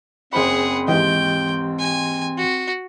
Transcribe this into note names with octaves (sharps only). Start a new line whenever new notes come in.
F#1 C4 G#4 C5 F#5 B5
D#2 G#2 E3 G4 D#5 G5
G#5
F#4